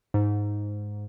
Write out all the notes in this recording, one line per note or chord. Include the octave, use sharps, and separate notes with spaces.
G#2